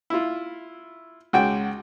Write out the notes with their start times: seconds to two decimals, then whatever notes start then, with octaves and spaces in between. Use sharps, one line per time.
0.10 E4 F4
1.33 C#2 F#4 G5